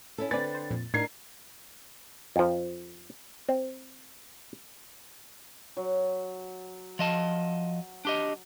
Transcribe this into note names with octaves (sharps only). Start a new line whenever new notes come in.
C#4 E4 A4
D3 C4 B4 D5 G#5 A6
C5
F2 A#2
A2 D4 D#4 A#4 G#6 C7
F2 F3
C4
F#3
F3 D#5 A5
D4 G4 D#5